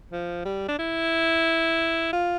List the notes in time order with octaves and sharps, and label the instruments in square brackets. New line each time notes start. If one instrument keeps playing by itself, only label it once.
[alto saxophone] F3
G3
D4
E4
F4